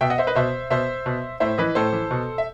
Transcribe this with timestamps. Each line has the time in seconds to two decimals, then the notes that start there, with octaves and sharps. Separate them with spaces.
0.01 B2 E5 G5
0.10 D#5 F#5
0.18 C5 E5
0.27 B4 D#5
0.35 B2 C5 E5
0.70 B2 C5 E5
1.06 B2
1.40 A2 C5 E5
1.58 E3 B4 D#5
1.75 A2 A4 C5
1.93 E3
2.11 B2
2.38 E5